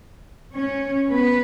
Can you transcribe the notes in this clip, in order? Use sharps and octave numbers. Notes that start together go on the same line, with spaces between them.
C#4 C#5
B3 B4